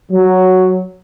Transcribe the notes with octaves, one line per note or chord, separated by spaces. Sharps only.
F#3